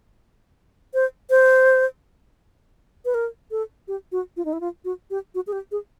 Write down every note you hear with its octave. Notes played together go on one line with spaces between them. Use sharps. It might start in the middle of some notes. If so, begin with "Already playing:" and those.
C5
C5
B4
A#4
A4
G4
F#4
F4
D#4
E4
F4
F#4
G4
F#4
G#4
G4
G#4